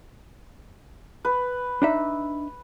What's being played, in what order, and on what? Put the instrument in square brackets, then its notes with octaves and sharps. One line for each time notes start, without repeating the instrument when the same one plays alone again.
[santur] B4
[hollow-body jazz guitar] D4 D#4 E5